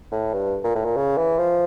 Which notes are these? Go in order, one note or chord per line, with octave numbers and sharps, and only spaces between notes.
A2
G2
A#2
A2
A#2
C#3
E3
F3